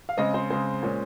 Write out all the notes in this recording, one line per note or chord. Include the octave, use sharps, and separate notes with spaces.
F5
C#3 G#3 C4 D#5
C5
C#3 G#3 C4 C5
A#2 G#3 C#4